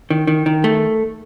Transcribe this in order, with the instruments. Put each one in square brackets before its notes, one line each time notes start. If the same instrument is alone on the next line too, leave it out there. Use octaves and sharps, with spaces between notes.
[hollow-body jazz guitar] D#3
D#3
D#3
A3